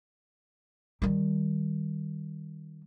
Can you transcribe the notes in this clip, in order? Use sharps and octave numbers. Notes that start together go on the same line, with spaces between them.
D#3 G3